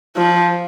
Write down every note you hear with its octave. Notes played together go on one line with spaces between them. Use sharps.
F3